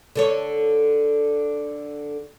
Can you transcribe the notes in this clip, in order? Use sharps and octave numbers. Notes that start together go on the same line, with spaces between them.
D3 A4 C#5